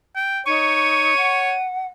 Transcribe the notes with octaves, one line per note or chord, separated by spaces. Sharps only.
G5
D#4 C#5 C#6 D#7
F#5